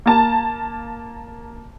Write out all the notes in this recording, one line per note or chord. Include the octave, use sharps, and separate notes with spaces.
A#3 A5